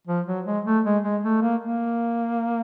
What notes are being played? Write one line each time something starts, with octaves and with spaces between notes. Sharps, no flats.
F3
F#3
G#3
A3
G#3
G#3
A3
A#3
A#3